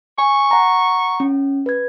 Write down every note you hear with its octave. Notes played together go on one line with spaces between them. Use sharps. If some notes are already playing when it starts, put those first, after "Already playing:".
G#5 C#6
F#5 A#5
C#4
B4 G#6